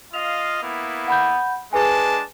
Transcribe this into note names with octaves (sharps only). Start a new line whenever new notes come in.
F4 D#5 F5 F7
A#3 B3 E4
F#5 B5 G6
G#3 D4 G#4 B4 G#5 A5